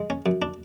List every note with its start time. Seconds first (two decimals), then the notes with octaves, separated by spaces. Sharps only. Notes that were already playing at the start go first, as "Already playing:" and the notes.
Already playing: G#3
0.10 C#4
0.26 F#2
0.42 D4